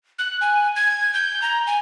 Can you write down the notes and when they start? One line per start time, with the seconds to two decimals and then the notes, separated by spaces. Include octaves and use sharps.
0.19 F#6
0.41 G#5
0.76 G#6
1.14 G6
1.42 A#5
1.67 G#5